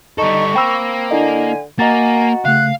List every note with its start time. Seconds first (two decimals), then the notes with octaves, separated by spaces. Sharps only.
0.18 G3 D#4 A4 C#6
0.55 A#3 C4 G5 B5 E6
1.11 D3 D4 E4 D#5 G#5
1.79 A#3 F#4 D#5 G#5 A#5 A6
2.45 C#3 A3 F5 F#6